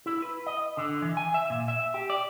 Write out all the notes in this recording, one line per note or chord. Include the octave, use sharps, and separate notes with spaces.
E4
B4
D#5
D3
E3
G#5
E5
A#2
E5
G4
D5